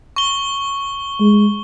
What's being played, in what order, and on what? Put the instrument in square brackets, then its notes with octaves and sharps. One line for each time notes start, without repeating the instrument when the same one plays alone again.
[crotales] C#6 G7
[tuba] G#3